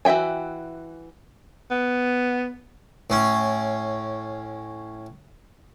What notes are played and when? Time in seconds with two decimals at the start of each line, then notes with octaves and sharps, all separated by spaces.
0.05 E3 F#4 E5 G5 G#5
1.71 B3
3.10 A2 C#4